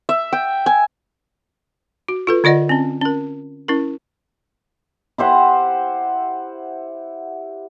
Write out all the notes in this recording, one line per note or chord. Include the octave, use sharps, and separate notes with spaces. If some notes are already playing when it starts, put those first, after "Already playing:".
E5
G5
G#5
F#4
F4 A4 B4
D3 F4 D5 D#5 F#5
C4 C#4
C#4 A#4
C#4 E4 A#4
E4 G4 C5 F#5